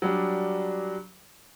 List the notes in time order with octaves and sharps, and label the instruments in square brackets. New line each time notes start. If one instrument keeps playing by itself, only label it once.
[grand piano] F#3 G3 D4